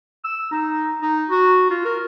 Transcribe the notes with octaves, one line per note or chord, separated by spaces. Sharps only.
E6
D#4
D#4
F#4
F4
A#4